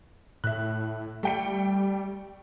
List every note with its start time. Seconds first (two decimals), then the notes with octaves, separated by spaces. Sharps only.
0.44 A2 E5 F#6
1.23 G3 A3 G5 C#7